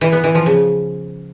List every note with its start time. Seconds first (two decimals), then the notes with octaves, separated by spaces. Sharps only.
0.01 E3
0.13 B3
0.24 E3
0.35 F3
0.46 C#3